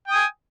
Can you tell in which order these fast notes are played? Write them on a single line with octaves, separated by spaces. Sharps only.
G5 D#6 G#5